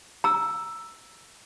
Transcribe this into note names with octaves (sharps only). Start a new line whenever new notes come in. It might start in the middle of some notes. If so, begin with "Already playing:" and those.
A#5 E6